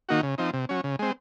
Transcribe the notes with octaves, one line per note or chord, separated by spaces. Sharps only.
D#3 A#3 D#4 F#4
C#3
F3 C4 D#4
C3
F#3 C#4
C#3
G#3 C4